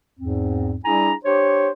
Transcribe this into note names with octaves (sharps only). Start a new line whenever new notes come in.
E2 G#2 C4
G3 D4 E4 G#4 G#5 A#5
D4 G4 C5 C#5